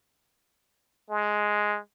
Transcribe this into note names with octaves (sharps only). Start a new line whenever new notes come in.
G#3